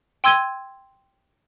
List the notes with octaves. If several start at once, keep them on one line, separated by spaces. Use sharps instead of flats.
G5 C6 E6 G#6 D#7 G7